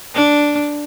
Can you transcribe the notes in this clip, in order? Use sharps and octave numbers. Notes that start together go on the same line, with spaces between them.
D4